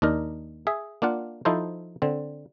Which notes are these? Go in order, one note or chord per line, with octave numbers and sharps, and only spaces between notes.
D#2 D4 D#4 A#4
G#4 E5
A#3 D4 F4 F#5
F3 D#4 E4 A4 C5
D3 C4